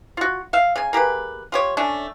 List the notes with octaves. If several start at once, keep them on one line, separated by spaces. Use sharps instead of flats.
F4 F#4
E5 F5
C#3 G#5
A#3 G4 G#4 B4
F4 G4 C#5
A3 C#4 D4